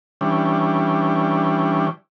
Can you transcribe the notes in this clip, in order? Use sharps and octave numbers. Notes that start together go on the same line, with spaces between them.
E3 G3 C#4 D4